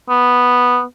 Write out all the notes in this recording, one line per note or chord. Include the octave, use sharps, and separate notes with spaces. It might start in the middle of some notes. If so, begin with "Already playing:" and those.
B3